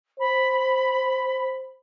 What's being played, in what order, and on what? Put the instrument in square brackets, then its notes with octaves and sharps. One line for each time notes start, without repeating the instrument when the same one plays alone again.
[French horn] C5 [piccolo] B5